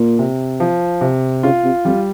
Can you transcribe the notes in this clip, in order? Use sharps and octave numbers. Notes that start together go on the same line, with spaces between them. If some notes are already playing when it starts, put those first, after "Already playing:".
Already playing: A#2
C3
F3
C3
C#3 F4
C3
F2 G3